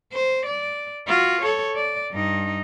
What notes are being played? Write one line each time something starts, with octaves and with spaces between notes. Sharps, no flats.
C5
D5
F4 F#4
A4 C#5
D5
G2 D#4